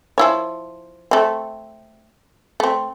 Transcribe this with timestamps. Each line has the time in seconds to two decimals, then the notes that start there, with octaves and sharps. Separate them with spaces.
0.18 F3 E4 C#5
1.11 A3 C4
2.60 A3 C4